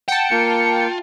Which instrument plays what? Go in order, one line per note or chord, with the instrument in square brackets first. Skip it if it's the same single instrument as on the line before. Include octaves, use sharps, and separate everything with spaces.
[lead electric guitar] F#5 [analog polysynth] G5 A5 [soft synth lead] C#7
[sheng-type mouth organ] A#3 [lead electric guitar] F4